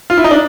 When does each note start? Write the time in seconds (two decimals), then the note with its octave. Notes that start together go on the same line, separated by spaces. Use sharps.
0.10 F4
0.18 E4
0.24 D#4
0.31 D4